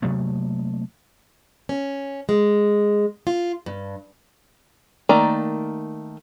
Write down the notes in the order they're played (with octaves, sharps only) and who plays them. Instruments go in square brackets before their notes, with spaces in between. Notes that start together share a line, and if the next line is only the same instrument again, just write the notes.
[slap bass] C3 F#3 A3 A#3
[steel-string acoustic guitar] C#4
G#3
F4
G2
[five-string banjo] D#3 A3 A#3 D5 A#5